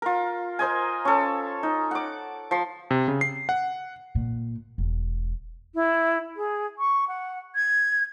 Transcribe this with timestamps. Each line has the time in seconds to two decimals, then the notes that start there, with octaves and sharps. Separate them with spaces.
0.02 F4 A#4
0.59 A#4 C5 D#5 G#5
1.05 C#4 A4
1.63 D#4
1.91 F#5 D6
2.51 F3 C6
2.91 C3
3.08 C#3
3.21 C7
3.49 F#5
4.15 A#2
4.78 E1
5.74 E4
6.36 G#4
6.78 C#6
7.08 F#5
7.55 G#6